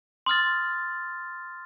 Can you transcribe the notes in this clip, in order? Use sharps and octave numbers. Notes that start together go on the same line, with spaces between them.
C6 D#6 F6 A6